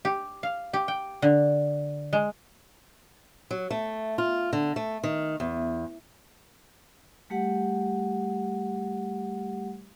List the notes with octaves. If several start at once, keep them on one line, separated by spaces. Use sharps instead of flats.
G4
F5
G4
G5
D3
G#3
F#3
A3
F4
D3
A3
D#3
E2
G3 A3 G4 F#5